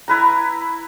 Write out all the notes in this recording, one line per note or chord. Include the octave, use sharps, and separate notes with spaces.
E4 B4 A#5